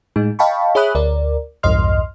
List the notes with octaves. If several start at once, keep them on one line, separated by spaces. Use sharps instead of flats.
A2 G#3 D#4
D#5 F5 G5 A5 B5 C#6
G#4 C#5 E5 B5 D#6 F#6
D2 A#4 D5
B1 E2 G2 D#5 C6 F6